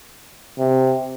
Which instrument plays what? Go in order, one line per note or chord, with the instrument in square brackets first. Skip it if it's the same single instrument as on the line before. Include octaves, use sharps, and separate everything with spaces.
[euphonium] C3